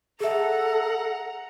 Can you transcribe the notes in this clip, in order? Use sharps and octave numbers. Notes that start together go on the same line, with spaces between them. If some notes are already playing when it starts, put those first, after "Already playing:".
G#4 A4 E5 F#5 A#5